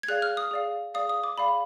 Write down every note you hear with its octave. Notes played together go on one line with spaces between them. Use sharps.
G#6
G#4 D5 F5 F#6
F6
D#6
G#4 D5 F5
G#4 D5 F5 D#6
D#6
D6
G#4 D5 F5 B5